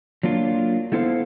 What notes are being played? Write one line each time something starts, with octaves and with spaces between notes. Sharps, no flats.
F#3 A#3 D4 F4
A3 B3 E4 A4 C5 F5